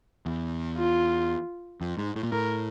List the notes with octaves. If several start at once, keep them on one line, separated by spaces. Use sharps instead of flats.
E2
F4
F2
G#2
A2
A#2
A2 A#4